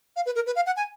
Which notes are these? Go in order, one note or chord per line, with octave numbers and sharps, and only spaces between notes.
F5
B4
A#4
B4
F5
F#5
G#5